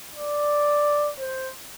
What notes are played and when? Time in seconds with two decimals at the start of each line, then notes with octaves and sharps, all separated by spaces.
0.16 D5
1.20 C5